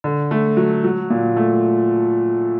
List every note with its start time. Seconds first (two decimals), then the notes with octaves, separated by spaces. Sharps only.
0.04 D3
0.31 A3
0.57 F#3
0.84 F#3
1.10 A#2
1.36 A3